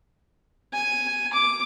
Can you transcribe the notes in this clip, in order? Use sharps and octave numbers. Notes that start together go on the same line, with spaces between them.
G#5
D6